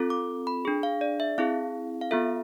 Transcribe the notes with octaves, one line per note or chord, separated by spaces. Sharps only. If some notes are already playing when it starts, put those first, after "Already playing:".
Already playing: C4 F4 A4
D6
B5
D4 G#4
F5
D5
E5
C4 E4 G#4 F5
F5
B3 F4 A4 E5